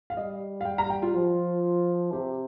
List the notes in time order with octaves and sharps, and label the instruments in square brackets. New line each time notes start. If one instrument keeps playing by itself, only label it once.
[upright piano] F5
[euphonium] G3 [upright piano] D#5
[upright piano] F5
[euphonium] G3 [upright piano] G5
[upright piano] A#5
G5
F4
[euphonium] F3 [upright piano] F4
[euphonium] C3 [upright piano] G4